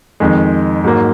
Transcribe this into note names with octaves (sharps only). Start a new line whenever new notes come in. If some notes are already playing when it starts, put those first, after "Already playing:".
F2 D#3 G#3
G#2 F#3 A#3